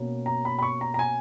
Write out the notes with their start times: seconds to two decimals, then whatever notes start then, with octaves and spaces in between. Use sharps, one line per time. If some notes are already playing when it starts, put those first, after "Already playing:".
Already playing: B2 A#3 C#4
0.26 A#5
0.45 B5
0.59 B5
0.63 C#6
0.81 A#5
0.94 A#5
0.99 G#5